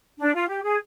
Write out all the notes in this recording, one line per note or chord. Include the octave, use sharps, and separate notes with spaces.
D4
F4
G4
G#4